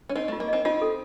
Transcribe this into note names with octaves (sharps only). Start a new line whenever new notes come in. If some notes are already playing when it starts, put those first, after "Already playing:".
C#4
C4 D#4 D#5
A3 F4
A#3
C4 D#4 D#5
C4 D#4 F4
A4